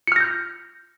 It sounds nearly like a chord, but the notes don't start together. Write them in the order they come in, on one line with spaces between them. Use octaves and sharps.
C#7 F6 A#6 G6